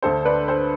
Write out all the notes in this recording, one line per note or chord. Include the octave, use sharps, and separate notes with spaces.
D2 D3 A4 C5
B4 D5
A4 C5